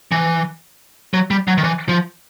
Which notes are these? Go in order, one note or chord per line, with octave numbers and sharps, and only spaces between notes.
E3
F#3
G3
F#3
D#3
E3
F3